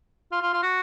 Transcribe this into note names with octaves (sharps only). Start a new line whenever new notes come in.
F4
F4
F4
F#4